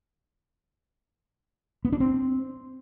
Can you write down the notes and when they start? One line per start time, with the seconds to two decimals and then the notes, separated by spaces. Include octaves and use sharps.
1.85 B3
1.92 D4
2.00 C4